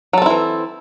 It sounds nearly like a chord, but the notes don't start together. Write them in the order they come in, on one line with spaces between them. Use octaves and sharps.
F#3 A4 C4 E4 E3